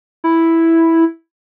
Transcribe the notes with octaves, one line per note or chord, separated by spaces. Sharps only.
E4